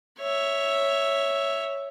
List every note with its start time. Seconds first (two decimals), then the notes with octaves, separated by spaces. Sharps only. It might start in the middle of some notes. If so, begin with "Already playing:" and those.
0.19 C#5 E5